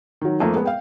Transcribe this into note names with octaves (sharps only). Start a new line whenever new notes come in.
D#3 F#3
F2 F3 A3 A#3
G#3 B3
F5 G5